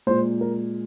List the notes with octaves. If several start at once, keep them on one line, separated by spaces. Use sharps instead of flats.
A#2 G#3 C5
A#4